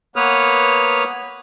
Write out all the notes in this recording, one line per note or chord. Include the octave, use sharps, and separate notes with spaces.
A#3 B3 B4 C#5 D#6 F6